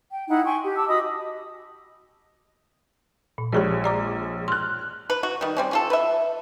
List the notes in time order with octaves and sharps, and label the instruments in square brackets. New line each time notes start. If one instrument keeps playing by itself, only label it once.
[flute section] G5
D#4 E4 F#5
G5 G#5 C6 C#6
G4
A5 D6 E6
F#4 D#5 B5 D#6
[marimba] A#2
[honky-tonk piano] A#1 G#3 C#5 [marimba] G4 G#4 D5
[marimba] D5 A#5 D6
[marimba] C6 [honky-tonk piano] F6 F#6
[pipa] B4
F#4
D#3 G3
G3 C4 C#4
C#4 F4 A4
B4 E5